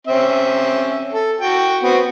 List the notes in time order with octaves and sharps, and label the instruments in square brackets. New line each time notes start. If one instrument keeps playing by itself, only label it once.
[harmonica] C4 C#4 E5
A4
F#4 G5
B3 C4 F#4